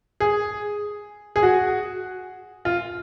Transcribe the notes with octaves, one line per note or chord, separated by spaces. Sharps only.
G#4
G#4
F#4
F4